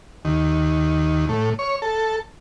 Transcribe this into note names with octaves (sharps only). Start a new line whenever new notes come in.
D#2
A2
C#5
A4